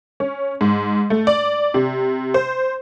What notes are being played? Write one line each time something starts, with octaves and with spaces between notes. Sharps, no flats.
C#4
G#2
A3
D5
C3
C5